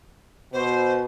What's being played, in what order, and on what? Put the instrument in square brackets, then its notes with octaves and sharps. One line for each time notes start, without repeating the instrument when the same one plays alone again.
[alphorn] B2 [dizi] C5